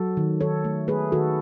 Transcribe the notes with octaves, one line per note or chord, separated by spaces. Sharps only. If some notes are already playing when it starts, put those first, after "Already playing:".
Already playing: F#3 F#4 A4
D#3
D#3 A4 C#5
A3
A3 G#4 B4
D#3 F#4 A4